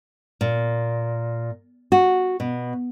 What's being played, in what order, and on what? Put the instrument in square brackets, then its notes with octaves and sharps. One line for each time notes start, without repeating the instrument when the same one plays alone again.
[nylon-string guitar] A#2
F#4
B2